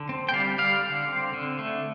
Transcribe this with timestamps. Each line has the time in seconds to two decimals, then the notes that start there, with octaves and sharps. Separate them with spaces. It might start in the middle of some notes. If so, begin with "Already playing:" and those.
Already playing: D3
0.09 C4
0.29 G5
0.33 G3 D5 F5
0.58 D3 D5 F5
0.84 D3
1.08 C4
1.34 D3
1.59 A3